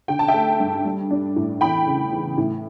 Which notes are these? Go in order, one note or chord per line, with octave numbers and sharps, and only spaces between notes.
D3 G5
A5
E5 G5
A3
G2
G3
D4
A2
E2 G5 B5
C#3
E3
A2